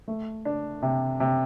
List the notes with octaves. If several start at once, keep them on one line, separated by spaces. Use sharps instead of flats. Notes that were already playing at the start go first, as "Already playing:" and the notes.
A3
D4
C3
C3